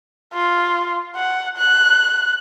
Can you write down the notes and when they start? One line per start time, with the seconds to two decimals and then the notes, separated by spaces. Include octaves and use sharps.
0.34 F4
1.15 F#5
1.57 F#6